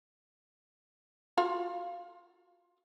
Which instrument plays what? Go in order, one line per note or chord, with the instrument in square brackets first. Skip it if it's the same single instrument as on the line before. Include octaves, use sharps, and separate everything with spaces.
[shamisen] F4 F#4 F5